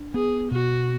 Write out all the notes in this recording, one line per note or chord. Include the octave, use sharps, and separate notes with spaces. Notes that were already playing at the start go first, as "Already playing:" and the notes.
Already playing: D4
B3 G#4
B2 F#4